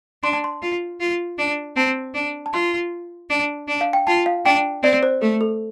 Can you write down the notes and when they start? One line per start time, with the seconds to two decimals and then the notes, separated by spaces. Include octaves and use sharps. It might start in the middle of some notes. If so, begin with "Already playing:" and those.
0.23 D4 C6
0.33 A5
0.44 C6
0.62 F4
1.00 F4
1.38 D4
1.76 C4 A5
2.14 D4
2.46 A5
2.53 F4 C6
3.30 D4
3.68 D4
3.81 F5
3.93 G5
4.07 F4 A5
4.26 F5
4.45 D4 G5
4.83 C4 D5
5.03 C5
5.22 A3 A4
5.41 A4